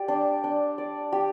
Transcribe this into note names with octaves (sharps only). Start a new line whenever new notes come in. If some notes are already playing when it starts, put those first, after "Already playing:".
Already playing: G4 D5
D4
D4
D5
G4